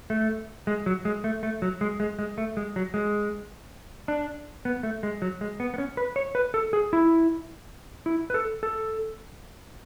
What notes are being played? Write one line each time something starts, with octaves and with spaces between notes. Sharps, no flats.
A3
G#3
F#3
G#3
A3
A3
F#3
G#3
G#3
G#3
A3
G#3
F#3
G#3
D4
B3
A3
G#3
F#3
G#3
B3
B3
C#4
B4
C#5
B4
A4
G#4
E4
E4
B4
A4
A4